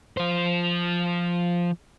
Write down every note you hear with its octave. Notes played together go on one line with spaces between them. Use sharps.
F3 C5